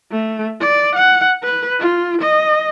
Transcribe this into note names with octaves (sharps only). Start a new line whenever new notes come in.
A3
D5
F#5
B4
F4
D#5